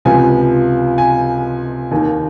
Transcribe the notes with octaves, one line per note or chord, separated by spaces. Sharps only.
C#2 C3 F3 G#5
G#5
D#2 D#3 G#5